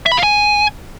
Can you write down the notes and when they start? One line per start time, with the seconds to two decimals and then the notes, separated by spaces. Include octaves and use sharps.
0.06 E5
0.12 B5
0.17 F5
0.23 G#5